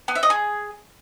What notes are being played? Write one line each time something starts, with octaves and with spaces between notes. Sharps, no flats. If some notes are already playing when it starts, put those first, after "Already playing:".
B3
E5
D#5
G#4